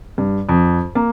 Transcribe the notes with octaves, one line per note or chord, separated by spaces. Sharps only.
G2
F2
A#3